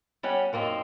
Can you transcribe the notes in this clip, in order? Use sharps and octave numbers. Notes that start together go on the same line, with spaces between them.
G3 C#4 G4 F#5
F#2 A#3 C4 D4 D#4